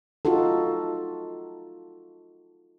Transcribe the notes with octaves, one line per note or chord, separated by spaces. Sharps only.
D#4 F4 F#4 A4